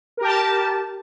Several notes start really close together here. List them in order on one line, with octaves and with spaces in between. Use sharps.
A#4 G4 A5